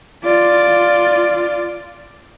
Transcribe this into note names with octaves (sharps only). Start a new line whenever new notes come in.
F4 D5